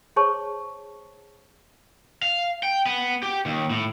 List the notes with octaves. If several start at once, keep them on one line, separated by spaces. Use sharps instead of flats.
G#4 C5 C#5 A5 C#6
F5
G5
B3
G4
D#2
A2